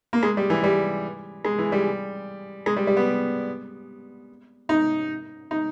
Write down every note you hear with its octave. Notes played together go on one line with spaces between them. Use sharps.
A#3
G#3
G3
E3
G3
G#3
E3
G3
G#3
G3
G3
B3
D#4
D#4